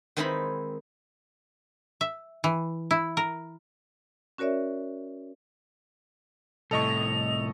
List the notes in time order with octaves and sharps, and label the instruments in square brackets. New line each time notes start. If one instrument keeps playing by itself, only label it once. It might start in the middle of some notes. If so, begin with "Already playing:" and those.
[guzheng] D#3 G#3 C4 D#4 E4 B5
[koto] E5
E3
E4
A#4
[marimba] C#4 F#4 A#4 C#5 D5 E5
[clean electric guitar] C2 A2 [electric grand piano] A4 D#5 C#6 [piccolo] F7